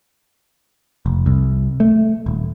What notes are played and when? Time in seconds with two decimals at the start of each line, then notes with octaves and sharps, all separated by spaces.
1.06 F1
1.26 C2
1.80 A3
2.26 D#1